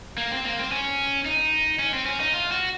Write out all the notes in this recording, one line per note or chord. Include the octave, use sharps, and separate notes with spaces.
A#3
C4
A#3
C4
C#4
D#4
C#4
C4
C#4
D#4
F4
F#4